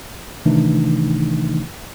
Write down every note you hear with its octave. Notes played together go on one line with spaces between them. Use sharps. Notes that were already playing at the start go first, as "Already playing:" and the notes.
C3 D#3 E3 A3 D4 D#4